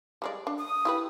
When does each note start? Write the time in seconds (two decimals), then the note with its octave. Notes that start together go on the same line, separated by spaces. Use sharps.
0.22 G3 G#3 D5
0.47 D4
0.59 D#6
0.85 E4 G4 B4